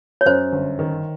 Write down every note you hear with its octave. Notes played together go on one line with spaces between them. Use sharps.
C#5
F#2 C5
G1
D#3